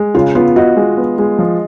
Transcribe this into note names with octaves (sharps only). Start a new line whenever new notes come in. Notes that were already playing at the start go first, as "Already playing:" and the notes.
Already playing: G#3
C#3 F4
B3 F4
F#4 D#5
G#3
B3
G#3
F3